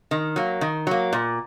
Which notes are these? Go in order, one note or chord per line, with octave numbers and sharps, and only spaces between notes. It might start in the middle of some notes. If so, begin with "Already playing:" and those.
D#3
F#3 A#3
D#3
F#3 A#3
A#2